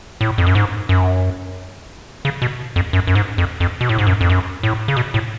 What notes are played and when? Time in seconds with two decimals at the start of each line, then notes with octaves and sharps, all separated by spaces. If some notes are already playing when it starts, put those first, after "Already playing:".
0.21 A2
0.38 F2
0.46 F#2
0.55 G#2
0.89 F#2
2.25 C#3
2.42 B2
2.76 F2
2.93 F#2
3.07 F#2
3.15 G#2
3.38 F2
3.60 F2
3.81 B2
3.89 A2
3.98 G#2
4.07 F#2
4.21 F2
4.29 F#2
4.63 A2
4.88 C#3
4.97 B2
5.14 A2